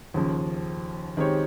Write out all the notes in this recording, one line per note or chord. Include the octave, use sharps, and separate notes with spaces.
D#2 C#3 F3
D#3 G#3 C4 G4 C#5